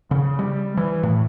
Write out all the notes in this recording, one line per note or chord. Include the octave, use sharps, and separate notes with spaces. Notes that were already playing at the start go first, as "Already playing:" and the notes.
C#3
G3
E3
A2